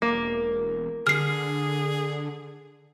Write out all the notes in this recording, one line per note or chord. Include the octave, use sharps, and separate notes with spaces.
E1 A#3
D3 G#4 F6 C7